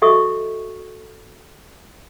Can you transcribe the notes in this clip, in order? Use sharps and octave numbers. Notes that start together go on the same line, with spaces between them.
F#4 A4 D#5 E5 C#6 D#6